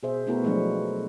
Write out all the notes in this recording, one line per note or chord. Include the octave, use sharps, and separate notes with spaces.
B2 G#4 C5 E5
A3 B3 E4 F#4 A#4
F3 F#3 G#3 A3 D4